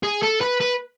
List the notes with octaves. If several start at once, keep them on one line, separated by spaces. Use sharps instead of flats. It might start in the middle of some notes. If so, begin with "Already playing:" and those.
G#4
A4
B4
B4